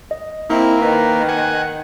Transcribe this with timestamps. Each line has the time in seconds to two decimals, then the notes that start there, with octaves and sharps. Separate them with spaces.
0.11 D#5
0.50 A#3 C4 E4
0.82 D#3 B4
1.28 F#5 G#5